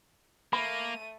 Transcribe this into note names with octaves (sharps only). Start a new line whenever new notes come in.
A3 A#3 B5 D#7